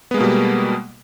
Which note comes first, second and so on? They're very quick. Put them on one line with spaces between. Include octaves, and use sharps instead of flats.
B3 G#3 A#3 B2 G3